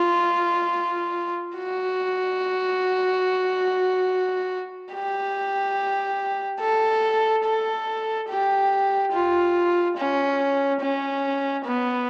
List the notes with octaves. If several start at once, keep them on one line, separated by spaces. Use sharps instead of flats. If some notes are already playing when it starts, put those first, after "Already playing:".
Already playing: F4
F#4
G4
A4
A4
G4
F4
C#4
C#4
B3